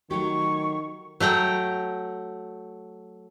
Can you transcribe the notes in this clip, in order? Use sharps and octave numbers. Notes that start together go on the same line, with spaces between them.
D#3 F#3 A3 G4 C#6
F#3 A3 G5 A#5